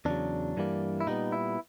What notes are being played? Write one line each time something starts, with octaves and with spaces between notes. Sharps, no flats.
E2 C#3 F#3 D4
G2 E3 G3 A#3
E4
A#2 G3 B3 D#4
E4